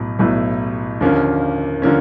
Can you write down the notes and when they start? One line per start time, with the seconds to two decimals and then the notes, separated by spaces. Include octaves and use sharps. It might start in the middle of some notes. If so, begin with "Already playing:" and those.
Already playing: B1 A2 F#3 B3
0.19 B1 A2 F#3 B3 E4
1.01 D#2 D3 F3 A#3 C#4
1.82 D3 F3 A#3 C#4